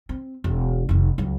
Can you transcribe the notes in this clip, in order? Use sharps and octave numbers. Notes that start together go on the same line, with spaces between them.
C4
E1
F1 D#3
C#2 F#3